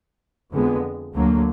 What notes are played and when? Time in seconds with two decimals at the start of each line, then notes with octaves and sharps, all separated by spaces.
0.53 F2 D3 G#3 B3
1.15 D2 D3 F#3 A#3